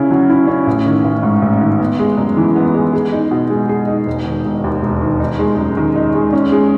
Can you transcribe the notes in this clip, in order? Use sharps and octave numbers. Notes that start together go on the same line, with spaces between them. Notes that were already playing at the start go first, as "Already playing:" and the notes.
Already playing: C#3 C#4 E4
F#3
E4
C#4
A1
D#3
A1
G#2
A1
D#3
B3
G#3
F#2
E3
B3
G#3
G#4
D#4
B2
G#3
G#4
D#4
E1
D#3
E1
D#2
E1
D#3
D#4
G#3
F#2
D#3
D#4
G#3
C#4
G#3